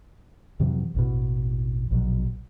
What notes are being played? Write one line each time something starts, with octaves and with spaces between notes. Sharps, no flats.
F2 C3 E3 F#3
A1 E2 B2
A#1 B2 F#3